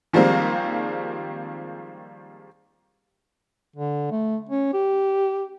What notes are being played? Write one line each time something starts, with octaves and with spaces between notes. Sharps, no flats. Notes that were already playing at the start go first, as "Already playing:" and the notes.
D#3 F3 G3 G#3 A#3 C4
D3
A3
C#4
G4